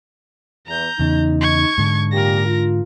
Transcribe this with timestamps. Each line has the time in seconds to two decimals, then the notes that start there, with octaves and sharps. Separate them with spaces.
0.67 E2 A#5 G6
0.99 E2 C#3 D#4
1.41 C#6 G#6
1.78 G#2 D3
2.12 A#2 G4 A#4 A#6
2.46 F4